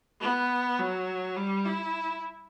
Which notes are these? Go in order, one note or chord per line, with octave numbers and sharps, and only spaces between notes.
B3
F#3
G3
E4